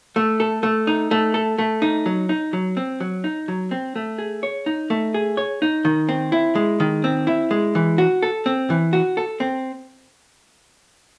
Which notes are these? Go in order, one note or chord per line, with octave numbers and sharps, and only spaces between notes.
A3
A4
A3
D#4
A3
A4
A3
D#4
F#3
D#4
F#3
C4
F#3
D#4
F#3
C4
A3
G#4
C#5
D#4
A3
G#4
C#5
D#4
D#3
C4
E4
G#3
D#3
C4
E4
G#3
E3
F#4
A4
C4
E3
F#4
A4
C4